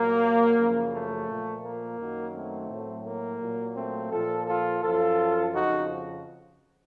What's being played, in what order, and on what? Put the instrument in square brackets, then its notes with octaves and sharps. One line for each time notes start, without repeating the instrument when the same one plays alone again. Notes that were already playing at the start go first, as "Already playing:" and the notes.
Already playing: [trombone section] A#2 F#3 A#3
F#2 C#3 F3
A3
A#2 F3
A#3
F#2 D#3 F#3
A3 C4
A2 F#3
A#3
A#2 F#3
A3 C4
A#2 F3 F4 A4
F4 A4
F#2 F3 F4 A4
F2 C#3 F3 D#4 F#4